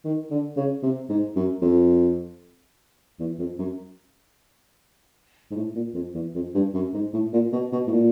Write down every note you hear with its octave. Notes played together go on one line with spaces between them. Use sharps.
D#3
D3
C#3
C3
G#2
F#2
F2
E2
F2
F#2
G#2
A2
A#2
F2
E2
F2
G2
F#2
G#2
A2
A#2
B2
B2
A2
A#2